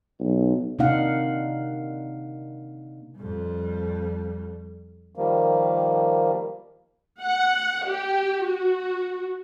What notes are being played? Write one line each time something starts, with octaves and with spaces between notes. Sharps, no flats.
B1
C3 A#3 D4 D#4 F5 F#5
F2 G3
D#3 F3 G3 A#3
F#5
G4
F#4